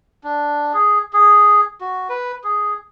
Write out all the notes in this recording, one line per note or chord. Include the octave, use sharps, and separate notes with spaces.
D4
G#4
G#4
F#4
B4
G#4